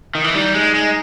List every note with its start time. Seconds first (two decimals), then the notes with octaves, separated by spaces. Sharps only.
0.15 D#3
0.24 E3
0.34 G3 D#4
0.55 G#3
0.74 G#3